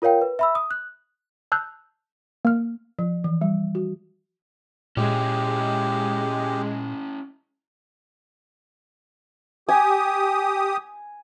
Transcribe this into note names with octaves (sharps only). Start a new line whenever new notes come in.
F4 A#4 C#5 F5 G5
B4
E5 B5 E6
D#6
F#6
A5 E6 F#6 G6
A#3 F6
F3
E3
G3
F#4
A#2 G#3 C#4 E4 G4
G4 G#5 D#6